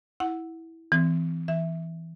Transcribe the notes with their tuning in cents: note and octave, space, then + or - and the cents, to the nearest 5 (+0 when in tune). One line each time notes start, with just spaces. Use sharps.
E4 -10 F#5 -5
E3 +0 C4 -25
E3 +0 E5 -5